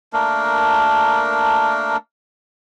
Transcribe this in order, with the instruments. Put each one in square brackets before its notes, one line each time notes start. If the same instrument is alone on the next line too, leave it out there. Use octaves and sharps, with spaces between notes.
[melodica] A3 A#3 D4 A#4